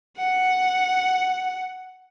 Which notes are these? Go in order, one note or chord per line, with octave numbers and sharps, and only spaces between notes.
F#5